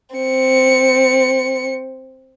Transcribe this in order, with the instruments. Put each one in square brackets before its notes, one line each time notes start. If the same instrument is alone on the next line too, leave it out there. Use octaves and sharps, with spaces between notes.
[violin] C4 C#7